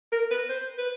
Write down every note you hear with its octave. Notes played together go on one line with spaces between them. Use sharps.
A#4
B4
C5
B4